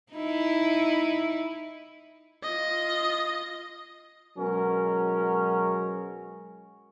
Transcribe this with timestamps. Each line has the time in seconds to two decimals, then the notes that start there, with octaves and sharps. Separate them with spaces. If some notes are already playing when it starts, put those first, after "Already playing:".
0.13 D#4 E4
2.42 F4 D#5
4.38 B2 F#3 G#3 C#4 A#4